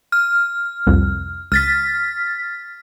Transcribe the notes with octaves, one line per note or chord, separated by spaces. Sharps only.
F6
C2 F2
C#2 F6 A6 B6